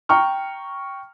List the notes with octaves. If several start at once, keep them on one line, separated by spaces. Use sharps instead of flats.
G5 A#5 C#6 F6